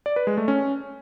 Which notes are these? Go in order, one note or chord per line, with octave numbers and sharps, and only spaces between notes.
D5
B4
G#3
A3
C#4